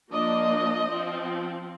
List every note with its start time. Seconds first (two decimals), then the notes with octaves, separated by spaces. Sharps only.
0.12 F3 A#3 D4 D#5
0.89 F3 C4